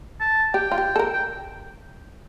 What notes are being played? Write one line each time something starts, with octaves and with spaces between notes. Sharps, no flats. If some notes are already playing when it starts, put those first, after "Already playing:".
A5
G4 G5
F4
G4
A4
A#4
G5